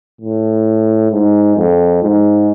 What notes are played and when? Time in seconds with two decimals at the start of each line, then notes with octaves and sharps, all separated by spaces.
0.21 A2
1.12 G#2
1.56 F2
2.02 G#2